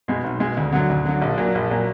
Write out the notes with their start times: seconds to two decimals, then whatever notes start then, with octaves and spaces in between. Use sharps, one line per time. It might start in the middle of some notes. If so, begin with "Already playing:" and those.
0.08 B2 G#3
0.24 B1
0.40 B2 G#3
0.57 D2
0.72 D3 F#3
0.90 D2
1.06 D3 F#3
1.21 A#1
1.38 A#2 F#3
1.55 A#1
1.71 A#2 F#3